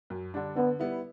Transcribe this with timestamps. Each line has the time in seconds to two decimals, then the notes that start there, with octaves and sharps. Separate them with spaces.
0.10 F#2
0.34 D3 G3 D4
0.56 D3 B3
0.79 G3 B3 E4